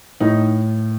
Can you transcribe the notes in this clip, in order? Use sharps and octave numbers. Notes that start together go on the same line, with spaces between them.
A2 D#4